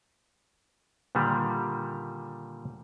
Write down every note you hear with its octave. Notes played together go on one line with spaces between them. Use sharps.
A#2 D3 D#3 G3